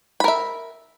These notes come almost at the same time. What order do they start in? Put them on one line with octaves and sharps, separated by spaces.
B5 A#4 E5